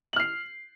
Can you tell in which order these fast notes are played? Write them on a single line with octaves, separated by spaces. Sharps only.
F#7 F6 C7